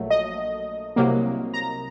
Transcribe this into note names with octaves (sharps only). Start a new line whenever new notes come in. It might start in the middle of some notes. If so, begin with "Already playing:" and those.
Already playing: A#1 A#2 F#3 A3
D#5
C2 C3 F#3 A#3
A#5